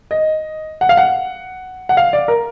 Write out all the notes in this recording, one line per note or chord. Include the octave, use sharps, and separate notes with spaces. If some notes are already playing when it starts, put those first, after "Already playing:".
D#5
F#5
F5
F#5
F#5
F5
D5
A#4